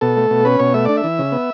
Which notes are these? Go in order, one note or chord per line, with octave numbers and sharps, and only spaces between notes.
B2 A4
A3
B2
C#4 B4
B2 C#5
A3 E5
D4 D5
E5
E3
C#3
B3